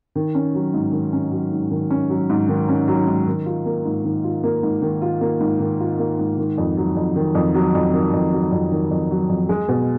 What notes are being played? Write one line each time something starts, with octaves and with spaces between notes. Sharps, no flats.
D#3
C#4
F#3
G#2
D#3
C#4
F#3
G#2
D#3
C#4
F#3
G#2
D#3
C#4
F#3
G#2
D#3
F4
A#3
G#2
D#3
F4
A#3
G#2
D#3
F4
A#3
G#2
D#3
F4
A#3
G#2
D#3
F2
F#3
F2
D#3
F2
F#3
F2
D#3
F2
F#3
F2
D#3
F2
F#3
F2
G#3
B2